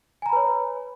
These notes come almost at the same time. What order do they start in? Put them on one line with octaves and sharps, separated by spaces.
G#5 A#5 B5 B4 C#5